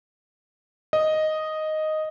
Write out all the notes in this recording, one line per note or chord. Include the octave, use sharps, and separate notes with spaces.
D#5